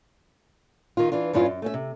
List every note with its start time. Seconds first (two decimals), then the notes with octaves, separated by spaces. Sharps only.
0.97 D#3 F4
1.12 E3 D4 F4
1.33 E2 G2 C#4 E4 F4
1.46 F#2
1.62 A3 C#4 E5
1.74 C3